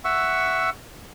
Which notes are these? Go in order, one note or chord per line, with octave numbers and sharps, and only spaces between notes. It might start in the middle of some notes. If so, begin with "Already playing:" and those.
E5 F#5 C#6 E6